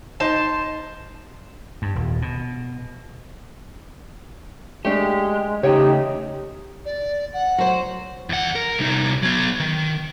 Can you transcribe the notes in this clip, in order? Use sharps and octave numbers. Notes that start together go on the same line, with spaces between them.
D#4 C5 D#5 A5
G2
D#1
B2
G#3 A3 D4 G4
C#3 A3 D#4 G4 C#5 G5
D5
F#5
F#3 C5
E2 F#5
A#4
C2 D#4
F#3 B3
D#3